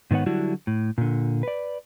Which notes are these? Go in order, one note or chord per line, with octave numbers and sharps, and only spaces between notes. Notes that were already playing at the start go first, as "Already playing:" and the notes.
G#2 D#3 B3 C#5 F#5
D3 F#3 G3 D4 E4 F#4
A2
A#2 D3
B4 D5